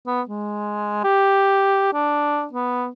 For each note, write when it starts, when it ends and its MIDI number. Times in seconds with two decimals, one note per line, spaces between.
0.06 0.22 59
0.29 1.04 56
1.04 1.89 67
1.93 2.46 62
2.53 2.88 59